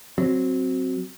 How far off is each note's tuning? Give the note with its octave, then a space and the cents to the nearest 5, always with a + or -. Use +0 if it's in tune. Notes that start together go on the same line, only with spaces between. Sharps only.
F#3 +0 C4 +0